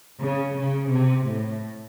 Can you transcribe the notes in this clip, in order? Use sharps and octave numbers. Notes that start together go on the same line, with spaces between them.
C#3
C#3
C3
A2